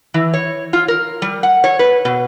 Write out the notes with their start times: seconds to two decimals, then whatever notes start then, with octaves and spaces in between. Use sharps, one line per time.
0.14 E3
0.34 C#5
0.73 F4
0.88 A#4
1.22 G3
1.43 F#5
1.64 C#5
1.79 B4
2.05 B2